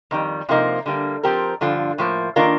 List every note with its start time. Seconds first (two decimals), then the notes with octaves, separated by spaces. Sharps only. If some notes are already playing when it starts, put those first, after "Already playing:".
0.11 F2 D#3 G3
0.49 C3 F3 A#3 D#4
0.86 D3 G3 A#3
1.23 F3 C4 G4 A#4
1.61 G2 D3 F3 F4
1.98 A2 F3 A#3
2.36 D#3 A#3 D4 F4 A#4